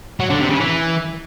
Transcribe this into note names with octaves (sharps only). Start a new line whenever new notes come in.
F#3
D3
C3
C#3
E3